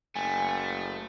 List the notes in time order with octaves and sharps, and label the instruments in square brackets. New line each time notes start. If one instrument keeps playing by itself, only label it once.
[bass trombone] F#1 [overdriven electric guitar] A3 [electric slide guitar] G#5